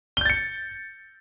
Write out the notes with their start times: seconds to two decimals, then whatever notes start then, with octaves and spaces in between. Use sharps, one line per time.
0.17 G7
0.21 G6
0.25 A6
0.30 C#7